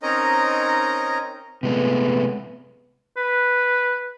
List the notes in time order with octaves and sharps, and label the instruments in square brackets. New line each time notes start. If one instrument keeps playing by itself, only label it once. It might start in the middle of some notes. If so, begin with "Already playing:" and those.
[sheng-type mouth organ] C4 C#4 D#4 A#4 D#5 A#5
[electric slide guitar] C3 G#3 A3 [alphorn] B3
[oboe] B4